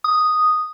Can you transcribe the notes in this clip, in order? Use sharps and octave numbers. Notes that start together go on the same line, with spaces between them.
D#6